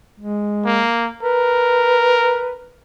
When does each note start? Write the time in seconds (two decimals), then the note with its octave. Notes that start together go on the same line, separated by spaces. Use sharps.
0.20 G#3
0.65 A#3
1.23 A#4 B4